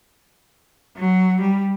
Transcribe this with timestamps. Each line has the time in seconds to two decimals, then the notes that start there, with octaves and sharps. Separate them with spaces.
0.97 F#3
1.41 G3